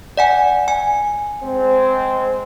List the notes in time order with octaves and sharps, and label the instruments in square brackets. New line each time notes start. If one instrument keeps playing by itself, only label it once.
[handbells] D5 F#5 G#5
G#5
[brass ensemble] G#3 C4 C5